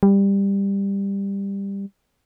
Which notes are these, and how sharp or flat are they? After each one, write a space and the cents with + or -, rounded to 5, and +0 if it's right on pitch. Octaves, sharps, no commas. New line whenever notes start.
G3 +15